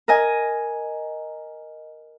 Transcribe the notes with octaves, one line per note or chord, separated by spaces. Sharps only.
A#4 D#5 G#5